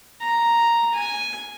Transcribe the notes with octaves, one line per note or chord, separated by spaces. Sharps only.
A#5
G#5